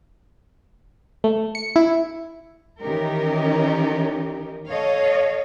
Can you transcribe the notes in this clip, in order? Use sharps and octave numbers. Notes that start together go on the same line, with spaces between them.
A3
C#7
E4
D#3 E3 C#4 D#4 G4 A#4
A4 C#5 D#5 F5